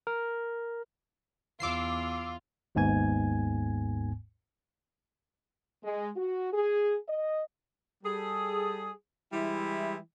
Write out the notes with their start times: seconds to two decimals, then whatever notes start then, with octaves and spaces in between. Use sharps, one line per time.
0.07 A#4
1.60 E2 F4 D6 E6 C7
2.75 G#1 D#2 G#2 B3 G#5 G#6
5.83 G#3
6.17 F#4
6.53 G#4
7.08 D#5
8.04 G3 G#4 A4
9.33 E3 G3 G#3 E4